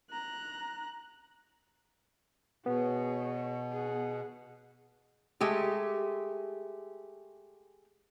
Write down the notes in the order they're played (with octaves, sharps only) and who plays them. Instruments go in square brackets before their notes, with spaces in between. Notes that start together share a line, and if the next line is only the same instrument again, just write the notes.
[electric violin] A#5 F#6
[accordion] B2 [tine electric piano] B3 [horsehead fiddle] G#4 C#5
[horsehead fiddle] G#4 F#5
[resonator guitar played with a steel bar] G#3 A3 G4